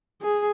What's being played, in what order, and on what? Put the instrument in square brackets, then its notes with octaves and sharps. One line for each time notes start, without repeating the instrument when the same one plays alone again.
[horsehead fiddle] G#4